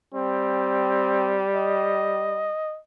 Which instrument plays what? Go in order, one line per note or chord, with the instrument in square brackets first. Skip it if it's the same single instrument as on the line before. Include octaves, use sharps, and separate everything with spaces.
[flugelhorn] G3 [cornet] C4
[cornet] D#5